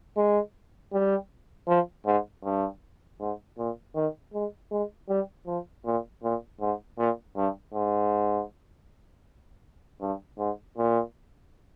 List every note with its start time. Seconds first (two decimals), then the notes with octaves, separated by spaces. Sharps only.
0.16 G#3
0.93 G3
1.68 F3
2.06 G#2
2.43 G2
3.20 G#2
3.58 A#2
3.95 D#3
4.34 G#3
4.71 G#3
5.09 G3
5.47 F3
5.85 A#2
6.23 A#2
6.61 G#2
6.98 A#2
7.36 G2
7.74 G#2
10.01 G2
10.39 G#2
10.77 A#2